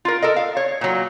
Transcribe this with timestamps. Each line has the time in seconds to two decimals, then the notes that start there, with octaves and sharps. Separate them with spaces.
0.05 F4 A#4
0.22 A4 A#4 D#5
0.36 F5
0.57 C#5
0.81 A#2 F#3